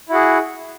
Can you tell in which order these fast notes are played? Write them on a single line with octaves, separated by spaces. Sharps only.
E4 F#4 G#4